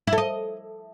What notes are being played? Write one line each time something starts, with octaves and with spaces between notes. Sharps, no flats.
E4
A4
D#5